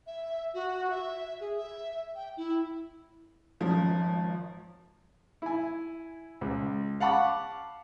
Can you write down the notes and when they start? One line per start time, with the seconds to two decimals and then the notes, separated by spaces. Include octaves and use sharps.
0.07 E5
0.54 F#4
0.90 E5
1.40 G#4
1.57 E5
2.15 G5
2.37 E4
3.60 G#1 F3 C#4
5.42 E4 G#5
6.41 C#2
7.00 F5 F#5 A5 B5 C#6 D6